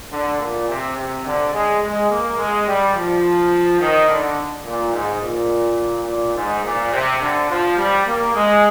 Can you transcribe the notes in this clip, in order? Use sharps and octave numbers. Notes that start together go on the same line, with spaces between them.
D3
A#2
C3
C3
D3
G#3
G#3
A#3
G#3
G3
F3
D#3
D3
A#2
G#2
A#2
A#2
G#2
A#2
C3
D3
F3
G3
A#3
G#3